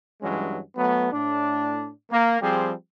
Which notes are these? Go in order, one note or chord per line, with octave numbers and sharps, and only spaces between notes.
G2 E3 F#3 G#3 C#4
F#3 A3 B3
A2 D4
A#3
F3 G3 C4 G4 G#4